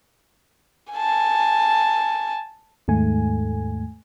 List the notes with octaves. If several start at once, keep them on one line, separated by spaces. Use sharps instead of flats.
G#5 A5
D#2 G#2 A3 G#5